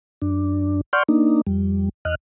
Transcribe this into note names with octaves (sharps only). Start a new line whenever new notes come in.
F#2 D4
D5 F#5 C6 C#6 F6 G6
A#3 D4 D#4
F2 G3
E2 D#5 F6 F#6